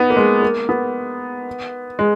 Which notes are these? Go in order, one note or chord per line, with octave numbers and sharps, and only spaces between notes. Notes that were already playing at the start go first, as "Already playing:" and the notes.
Already playing: B3 D#4
A#3
G#3
A#3
B3
G#3